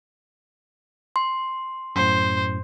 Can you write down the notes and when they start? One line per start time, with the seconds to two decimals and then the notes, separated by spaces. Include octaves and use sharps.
1.16 C6
1.96 F#2 A2 C5